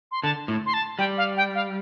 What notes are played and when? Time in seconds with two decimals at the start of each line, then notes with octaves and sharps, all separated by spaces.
0.11 C6
0.23 D3 A5
0.48 A2
0.66 C6
0.74 A5
0.99 G3 G5
1.18 F5
1.37 G5
1.55 F5